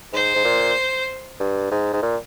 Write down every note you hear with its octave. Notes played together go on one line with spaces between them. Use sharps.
G#2 C5
G#2
A#2
G2
G#2
G#2
A#2